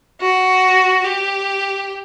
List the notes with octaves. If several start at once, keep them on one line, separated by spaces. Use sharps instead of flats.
F#4
G4